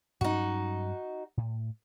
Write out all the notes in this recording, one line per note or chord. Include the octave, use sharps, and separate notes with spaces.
G2 F#3 C#4 D#4 F#4
A2